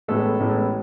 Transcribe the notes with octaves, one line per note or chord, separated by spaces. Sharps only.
A1 A2 G#3 A3 B3 A4
A1 A2 G#3 B3